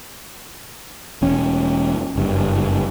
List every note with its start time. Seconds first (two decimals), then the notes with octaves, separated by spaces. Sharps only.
1.22 E1 C#4
2.16 F#1 G2